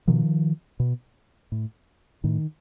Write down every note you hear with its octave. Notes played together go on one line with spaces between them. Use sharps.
B2 D#3 F3
B2
A2
A2 D#3